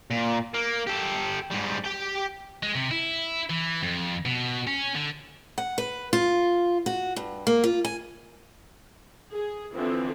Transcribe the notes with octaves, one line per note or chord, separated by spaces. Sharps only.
A#2
A#3
G4 A4
G#2 G3
G4 G5
G#3
C3
E4
E3
F2
B2
C#4
D3
F#5
B4
F4
F#4
G2
A#3
F4
G#5
G#4
D3 E3 F3 C4